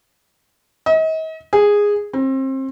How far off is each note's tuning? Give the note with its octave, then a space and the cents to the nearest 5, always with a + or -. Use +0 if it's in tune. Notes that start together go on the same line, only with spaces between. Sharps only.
D#5 +40
G#4 -10
C4 +30